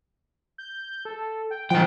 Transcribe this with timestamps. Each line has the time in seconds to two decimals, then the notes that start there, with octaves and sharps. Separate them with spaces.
0.58 G6
1.05 A4
1.50 G5
1.70 E3 F3 G5